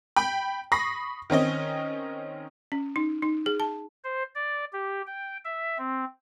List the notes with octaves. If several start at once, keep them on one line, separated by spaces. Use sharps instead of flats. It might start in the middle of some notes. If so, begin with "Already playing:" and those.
G5 B5
B5 C#6 D#6 A#6 C7
D#3 C4 C#4 D#5
C#4
D#4
D#4
G#4
A5
C5
D5
G4
G5
E5
C4